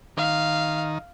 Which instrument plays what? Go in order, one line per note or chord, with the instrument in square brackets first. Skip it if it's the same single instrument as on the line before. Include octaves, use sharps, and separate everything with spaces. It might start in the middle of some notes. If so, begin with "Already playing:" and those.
[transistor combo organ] D#3 [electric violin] F5